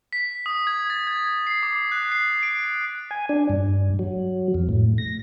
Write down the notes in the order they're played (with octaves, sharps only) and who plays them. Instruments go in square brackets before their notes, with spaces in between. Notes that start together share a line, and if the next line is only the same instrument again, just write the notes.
[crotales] B6
D#6
G#6
A6
G#6
C7
D6
F#6
C7
D7
D7
[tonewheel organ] G#5
D4
G2
F#3
F2
A2
A#6